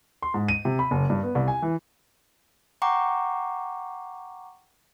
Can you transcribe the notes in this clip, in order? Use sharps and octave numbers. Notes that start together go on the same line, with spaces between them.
C6
G#2
D#7
C3
B5
F#1
G2
B3
C2
G#5
E3
F#5 G5 A#5 C#6 D6